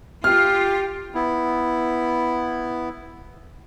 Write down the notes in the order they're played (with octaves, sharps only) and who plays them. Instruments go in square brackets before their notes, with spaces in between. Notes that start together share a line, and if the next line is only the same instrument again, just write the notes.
[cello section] F4 [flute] G4 [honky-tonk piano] F6
[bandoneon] B3 E4